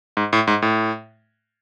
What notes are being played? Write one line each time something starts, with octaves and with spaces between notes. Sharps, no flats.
G#2
A2
G#2
A2